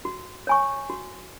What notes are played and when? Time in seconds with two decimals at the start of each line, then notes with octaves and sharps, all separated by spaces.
0.05 F#4
0.47 C#5 G#5 C#6
0.90 F#4